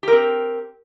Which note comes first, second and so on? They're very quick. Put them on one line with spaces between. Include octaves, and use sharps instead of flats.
G4 A#4 C4